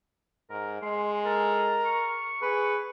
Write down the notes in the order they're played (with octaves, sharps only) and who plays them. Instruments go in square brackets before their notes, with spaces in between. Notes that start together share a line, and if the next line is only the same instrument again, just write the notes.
[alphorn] G#2 [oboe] A#4
[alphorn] G#3 [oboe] C6
[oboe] A4 [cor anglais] A#4
[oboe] C#6
[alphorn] G#4 [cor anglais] B4